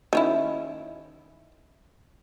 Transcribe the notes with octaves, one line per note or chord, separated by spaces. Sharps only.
D#3 C#4 E4